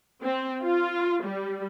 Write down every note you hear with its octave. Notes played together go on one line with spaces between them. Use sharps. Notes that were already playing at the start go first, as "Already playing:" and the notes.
C4
F4
G3